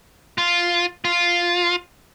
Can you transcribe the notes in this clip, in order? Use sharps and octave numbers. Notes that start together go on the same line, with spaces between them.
F4
F4